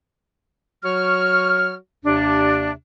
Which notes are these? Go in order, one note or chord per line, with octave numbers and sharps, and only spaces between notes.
F#3 F#4 C#5 C#6 F6
D#2 C3 D4